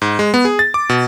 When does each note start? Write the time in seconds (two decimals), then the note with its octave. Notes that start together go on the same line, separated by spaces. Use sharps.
0.02 G#2
0.19 G#3
0.34 B3
0.45 G#4
0.59 A6
0.74 D6
0.89 B2